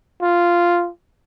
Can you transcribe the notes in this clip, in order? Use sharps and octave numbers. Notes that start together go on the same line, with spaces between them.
F4